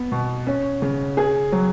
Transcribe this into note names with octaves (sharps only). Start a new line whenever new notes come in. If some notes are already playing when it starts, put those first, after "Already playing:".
Already playing: B3
B2
C#4
C#3
G#4
F#3